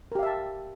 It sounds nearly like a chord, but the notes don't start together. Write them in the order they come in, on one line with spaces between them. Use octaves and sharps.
A#4 G4 F5 E5 A5